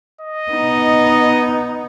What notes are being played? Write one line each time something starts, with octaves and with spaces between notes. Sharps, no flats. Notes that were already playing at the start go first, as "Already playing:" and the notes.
D#5
B3 D#4